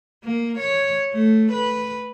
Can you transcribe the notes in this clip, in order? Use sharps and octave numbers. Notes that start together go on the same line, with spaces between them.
A#3
C#5
A3
B4